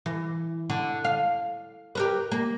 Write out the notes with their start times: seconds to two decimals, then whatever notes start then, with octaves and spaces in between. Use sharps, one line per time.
0.06 E3
0.70 D3
1.05 F5
1.95 G4 A#4 B4
2.32 A#3